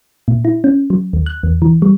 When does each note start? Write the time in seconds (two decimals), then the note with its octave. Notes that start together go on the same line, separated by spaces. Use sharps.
0.28 A#2
0.45 E4
0.64 C#4
0.90 F#3
1.13 D#2
1.26 F#6
1.43 E2
1.62 E3
1.82 G3